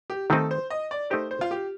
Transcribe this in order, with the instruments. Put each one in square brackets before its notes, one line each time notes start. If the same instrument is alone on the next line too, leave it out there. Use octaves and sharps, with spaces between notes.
[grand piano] G4
[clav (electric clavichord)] D#3 A3 C4 D#4 [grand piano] A4
[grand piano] C5
D#5
D5
[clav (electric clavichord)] A3 D#4 G4 A#4 [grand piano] C5
[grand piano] C5
F4
G4